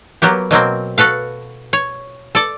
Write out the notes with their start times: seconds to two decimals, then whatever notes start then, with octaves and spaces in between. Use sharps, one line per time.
0.22 F#3 A#3 B3 G4
0.51 B2 F#3 A#3 C4
0.98 F#4 A4 B4 F5
1.73 C#5
2.35 A4 D5